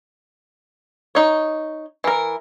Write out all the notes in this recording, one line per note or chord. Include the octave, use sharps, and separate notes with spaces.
D#4 C#5
E3 A#4